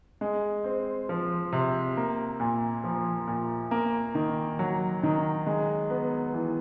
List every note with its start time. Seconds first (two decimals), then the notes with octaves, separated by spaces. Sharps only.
0.21 G#3
0.64 C4
1.09 F3
1.52 C3
1.97 A#3
2.40 A#2
2.84 F3
3.27 A#2
3.71 A#3
4.15 D#3
4.59 F#3
5.03 D#3
5.47 G#3
5.90 B3
6.34 E3